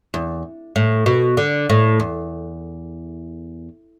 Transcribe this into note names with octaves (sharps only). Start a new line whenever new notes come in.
E2
A2
B2
D3
A2
E2